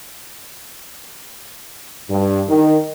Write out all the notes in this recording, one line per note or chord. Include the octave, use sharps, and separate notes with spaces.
G2
D#3